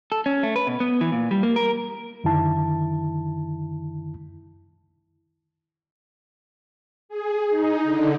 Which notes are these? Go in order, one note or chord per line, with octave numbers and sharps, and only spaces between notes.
A4
C#4
A3
B4
B2
B3
E3
A#2
G3
A#3
A#4
F#2 D3 D#3 E4 A5
G#4
D#4
D3